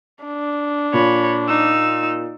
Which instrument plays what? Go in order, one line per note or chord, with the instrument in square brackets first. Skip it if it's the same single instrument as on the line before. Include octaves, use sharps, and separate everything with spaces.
[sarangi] D4
[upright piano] A#2 [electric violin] C#5 B5
[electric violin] D#4 E6